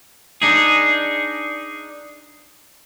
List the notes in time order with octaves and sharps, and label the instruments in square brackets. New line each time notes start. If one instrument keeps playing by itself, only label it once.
[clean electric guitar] D4 D#4 G#4